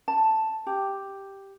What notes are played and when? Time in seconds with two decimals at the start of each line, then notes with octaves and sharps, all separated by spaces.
0.08 A5
0.67 G4